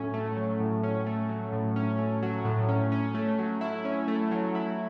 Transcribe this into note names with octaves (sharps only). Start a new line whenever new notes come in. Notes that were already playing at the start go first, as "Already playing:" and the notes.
Already playing: A2 F#3 A3 C#4
A3
F#3
A2
C#4
A3
F#3
A2
C#4
A3
F#3
A2
C#4
C#4
A3
F#3
E4
C#4
A3
F#3
E4